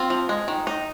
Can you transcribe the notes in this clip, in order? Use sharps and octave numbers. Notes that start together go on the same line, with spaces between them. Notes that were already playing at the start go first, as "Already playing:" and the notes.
Already playing: C4 F4
F3
G#3
D#3
D#4